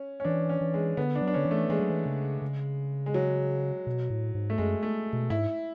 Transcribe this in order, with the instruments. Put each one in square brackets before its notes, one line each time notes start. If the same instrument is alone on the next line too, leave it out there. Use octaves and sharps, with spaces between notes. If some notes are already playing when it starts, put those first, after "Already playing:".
Already playing: [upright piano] C#4
C#4
[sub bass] E3 [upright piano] D4
[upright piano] C#4
[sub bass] E3
[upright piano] G#3
[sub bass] D3 [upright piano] B3
[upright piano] D4
[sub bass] F#3
[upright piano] D4
[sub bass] D3 [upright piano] C#4
[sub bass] E3
[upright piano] A3
[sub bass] E3 [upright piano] G#3
[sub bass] F#3
E3
C#3
C#3
[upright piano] G#3
F#3
[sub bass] B2
A2
G#2
[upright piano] A3
[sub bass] F#2 [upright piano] G#3
[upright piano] A3
[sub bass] B2
[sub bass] G#2 [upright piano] E4